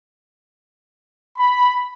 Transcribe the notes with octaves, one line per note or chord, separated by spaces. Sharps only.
B5